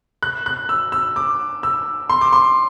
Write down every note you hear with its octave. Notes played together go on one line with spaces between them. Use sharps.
F#6
F#6
E6
E6
D6
E6
C6
D6
C6